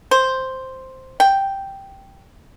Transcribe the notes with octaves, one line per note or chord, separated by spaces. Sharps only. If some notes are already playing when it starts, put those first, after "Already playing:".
C5
G5